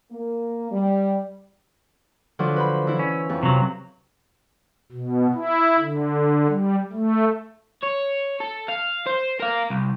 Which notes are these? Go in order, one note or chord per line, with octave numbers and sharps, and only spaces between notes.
A#3
G3
D3 F3 F#3
B4 C5 B5
E3 E4
C#4
F2
C3 F#3
B2
E4
D3
G3
A3
C#5
A4
F5
C5
A#4 F5
C2